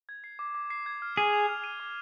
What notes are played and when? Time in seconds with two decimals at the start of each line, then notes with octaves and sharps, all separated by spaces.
0.09 G#6
0.24 C7
0.39 D6
0.55 D6
0.70 C7
0.86 G#6
1.02 F6
1.17 G#4 G#6
1.33 F7
1.49 F6
1.64 D#7
1.80 D6